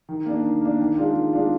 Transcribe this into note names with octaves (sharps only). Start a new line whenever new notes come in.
D#3
A#3 D4
D#3
A#3 D4
D#3
G#3 D4 F4
D#3
G#3 D4 F4